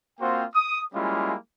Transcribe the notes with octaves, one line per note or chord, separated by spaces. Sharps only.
A#3 C4 F4 F#4 C5 G5
D#6
G3 G#3 A#3 C#4 E4 F4